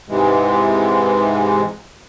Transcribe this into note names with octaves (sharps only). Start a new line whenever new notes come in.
G#2 C3 E3 G#3